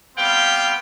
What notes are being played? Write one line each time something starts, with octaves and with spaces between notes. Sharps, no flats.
G3 B3 C4 F5 G5